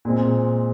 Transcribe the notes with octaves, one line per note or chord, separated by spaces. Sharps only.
A#2 G#3 C4